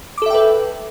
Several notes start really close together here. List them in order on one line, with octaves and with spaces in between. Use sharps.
D6 A4 E5 G5 B4